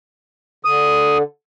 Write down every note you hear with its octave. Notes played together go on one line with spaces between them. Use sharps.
D3 D#6